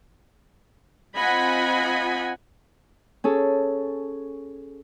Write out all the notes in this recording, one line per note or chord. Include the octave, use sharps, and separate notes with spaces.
C4 F4 D#5 F#5 G#5 B5
C#4 G#4 A4